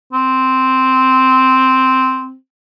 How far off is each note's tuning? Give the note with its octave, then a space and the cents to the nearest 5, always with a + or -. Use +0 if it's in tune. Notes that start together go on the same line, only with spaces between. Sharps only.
C4 -5